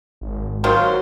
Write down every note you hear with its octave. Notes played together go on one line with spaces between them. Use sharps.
G#1
D#3 F#3 F4 C5